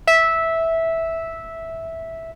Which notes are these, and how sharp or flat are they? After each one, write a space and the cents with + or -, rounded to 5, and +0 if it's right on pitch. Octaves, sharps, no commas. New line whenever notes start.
E5 -10